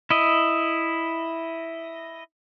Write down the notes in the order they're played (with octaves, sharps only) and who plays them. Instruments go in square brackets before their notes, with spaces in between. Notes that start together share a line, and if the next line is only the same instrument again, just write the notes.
[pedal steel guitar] E4 D#5